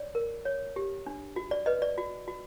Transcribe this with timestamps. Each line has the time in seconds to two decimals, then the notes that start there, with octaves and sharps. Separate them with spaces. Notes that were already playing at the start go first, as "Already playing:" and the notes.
Already playing: C#5 D5
0.15 A#4
0.45 C#5
0.76 G4
1.06 D4
1.36 F#4
1.51 D5
1.66 B4 D#5
1.82 D5
1.98 F#4
2.28 F#4